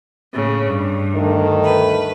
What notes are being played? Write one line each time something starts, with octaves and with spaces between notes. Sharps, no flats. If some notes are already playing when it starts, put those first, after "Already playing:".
A2 C#3
G2
D2 D#3 A3
B4